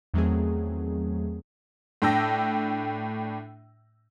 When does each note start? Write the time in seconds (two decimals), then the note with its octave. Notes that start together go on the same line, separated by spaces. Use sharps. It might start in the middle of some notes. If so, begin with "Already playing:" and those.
0.14 E2 D#3 F#3 A3 C4 G#4
2.02 A2 D4 G5 E6 A#6